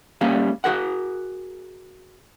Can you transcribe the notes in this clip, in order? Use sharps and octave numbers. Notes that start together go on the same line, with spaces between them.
G3 A#3 C#4 G#4 F5
F#4 G#4 A#4 F#5